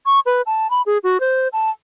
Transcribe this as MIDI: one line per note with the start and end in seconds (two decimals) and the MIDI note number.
0.06 0.20 85
0.26 0.42 71
0.46 0.70 81
0.70 0.82 83
0.86 0.98 68
1.04 1.20 66
1.20 1.48 72
1.53 1.70 81